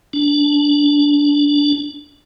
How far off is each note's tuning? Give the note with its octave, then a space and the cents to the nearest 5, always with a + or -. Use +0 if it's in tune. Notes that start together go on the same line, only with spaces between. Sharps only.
D4 -15